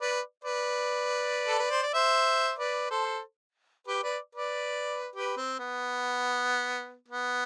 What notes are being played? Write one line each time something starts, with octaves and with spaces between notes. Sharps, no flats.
B4 D5
B4 D5
A4
B4
C5
D5
C5 E5
B4 D5
A4 C5
G4 B4
B4 D5
B4 D5
G4 B4
C4
B3
B3